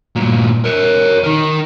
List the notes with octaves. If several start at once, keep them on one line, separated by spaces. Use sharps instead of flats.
G2 A#2
A#4 C#5
D#4 A#4